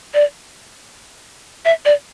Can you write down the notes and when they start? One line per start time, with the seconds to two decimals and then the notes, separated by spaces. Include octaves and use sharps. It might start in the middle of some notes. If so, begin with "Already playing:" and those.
0.14 D5
1.65 E5
1.85 D5